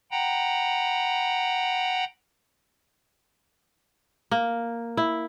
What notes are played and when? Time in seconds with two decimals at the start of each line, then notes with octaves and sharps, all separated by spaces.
0.11 F#5 G5 A#5 B5
4.31 A#3
4.97 E4